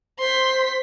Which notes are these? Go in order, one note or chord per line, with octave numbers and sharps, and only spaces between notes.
C5 C6 B6